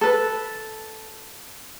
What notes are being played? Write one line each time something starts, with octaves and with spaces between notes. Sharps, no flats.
A4 B4